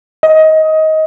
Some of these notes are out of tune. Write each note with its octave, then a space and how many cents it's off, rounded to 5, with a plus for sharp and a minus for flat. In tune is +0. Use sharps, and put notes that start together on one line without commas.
D#5 +20